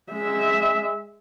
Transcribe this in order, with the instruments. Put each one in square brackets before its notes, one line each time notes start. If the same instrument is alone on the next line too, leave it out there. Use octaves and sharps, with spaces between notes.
[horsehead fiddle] G#3 E5